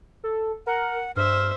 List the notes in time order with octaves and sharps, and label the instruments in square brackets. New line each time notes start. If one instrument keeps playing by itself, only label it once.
[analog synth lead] A4
[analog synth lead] A#4 [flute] F#5
[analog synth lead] G2 [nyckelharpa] C5 E5 [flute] F6